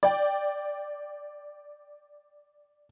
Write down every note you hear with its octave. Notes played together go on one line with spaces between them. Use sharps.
D5 G5